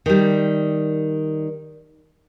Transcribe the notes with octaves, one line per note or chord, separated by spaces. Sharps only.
D#3 G3